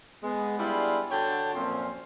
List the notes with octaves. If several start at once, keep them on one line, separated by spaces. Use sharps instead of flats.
G#3 B3
G3 B3 D4 E4 F4 G#4
D3 F#4 C#5 G5 A5
F#2 A#2 F3 C4 C#4 C6